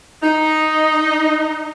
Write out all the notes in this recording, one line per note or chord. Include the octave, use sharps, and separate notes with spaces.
D#4